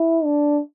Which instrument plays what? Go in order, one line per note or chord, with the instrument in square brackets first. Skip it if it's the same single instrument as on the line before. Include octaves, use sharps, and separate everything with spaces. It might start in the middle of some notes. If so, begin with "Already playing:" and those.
Already playing: [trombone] E4
D4